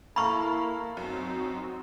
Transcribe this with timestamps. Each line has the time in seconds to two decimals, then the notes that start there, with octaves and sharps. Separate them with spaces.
0.16 A#3 E4 A4 F5 A#5 B5 C#6
0.97 F#2 F#3 C4 D#4